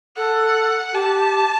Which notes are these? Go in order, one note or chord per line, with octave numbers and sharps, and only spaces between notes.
A4 F#5
G4 A5